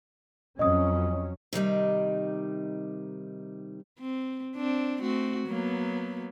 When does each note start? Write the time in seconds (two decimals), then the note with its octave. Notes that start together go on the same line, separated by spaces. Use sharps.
0.59 F2 F#3 C#4 D#5 D#6
1.53 C3 D#3 G3 D#4
3.99 C4
4.56 C4 D4
4.99 A3 C4 F#4
5.46 F#3 A#3 B3